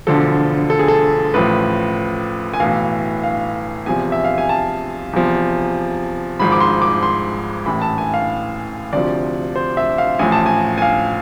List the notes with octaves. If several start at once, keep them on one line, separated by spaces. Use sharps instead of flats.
E1 D2 D3 F3 A4
A4
G#4
A4
A1 A2 F3 B4
G#5
B1 A2 E3 F5
F5
E2 C3 F3 G#5
E5
F5
G#5
A5
E2 C3 F3
G#1 G#2 F3 B5
D6
C6
D6
C6
A1 A2 E3 B5
A5
G#5
F5
D2 C3 F3 D5
C5
E5
F5
A1 A2 F3 G#5
A5
G#5
G#5
F5